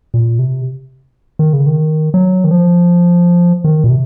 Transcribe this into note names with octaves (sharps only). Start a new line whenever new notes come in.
A#2
C3
D#3
C#3
D#3
F#3
D#3
F3
D#3
A#2
C3